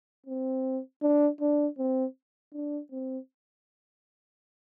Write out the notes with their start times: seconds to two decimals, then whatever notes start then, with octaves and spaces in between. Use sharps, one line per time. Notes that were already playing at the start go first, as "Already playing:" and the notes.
0.27 C4
1.02 D4
1.41 D4
1.79 C4
2.53 D4
2.92 C4